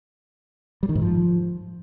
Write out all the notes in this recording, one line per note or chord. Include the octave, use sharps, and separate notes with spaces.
G3
D#3
G#2
F3